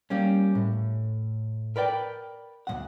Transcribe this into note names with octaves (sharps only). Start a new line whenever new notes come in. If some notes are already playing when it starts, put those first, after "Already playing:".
G3 A#3 C#4
A2
A#4 B4 D5 G5
D2 G2 F#5